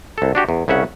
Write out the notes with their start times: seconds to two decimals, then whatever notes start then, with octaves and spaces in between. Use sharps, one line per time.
0.18 C2 A4
0.35 D4 F#4 G4
0.49 E2
0.68 C2 C#3 C#4 E5 F#5